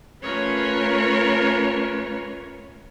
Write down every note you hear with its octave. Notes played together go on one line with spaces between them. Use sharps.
A3 C#4 F4 A#4 B4 C#5